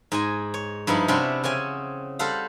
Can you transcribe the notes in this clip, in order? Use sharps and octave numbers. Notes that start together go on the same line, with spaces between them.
G#2 G#3 G#5
C#5
G2 F3 D#4 E4
C3 C#4 D4 F#4 B5 C6
C#3 C4 C#4 G#5
G3 A4 C5 F5 F#5